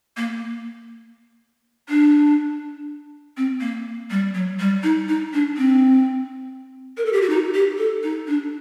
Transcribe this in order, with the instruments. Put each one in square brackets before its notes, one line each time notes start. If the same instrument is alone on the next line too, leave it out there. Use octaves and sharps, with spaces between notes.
[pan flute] A#3
D4
C4
A#3
G3
F#3
G3
D#4
D#4
D4
C4
A#4
A4
G4
F#4
D#4
G4
A4
D#4
D4